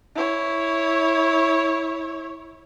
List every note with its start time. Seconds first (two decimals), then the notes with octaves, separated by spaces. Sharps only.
0.15 E4 C#5